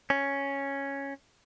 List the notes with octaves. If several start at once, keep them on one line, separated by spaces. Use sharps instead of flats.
C#4